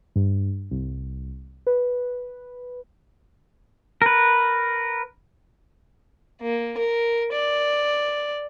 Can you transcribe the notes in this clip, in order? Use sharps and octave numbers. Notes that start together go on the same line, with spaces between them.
G2
C2
B4
A#4 B4
A#3
A#4
D5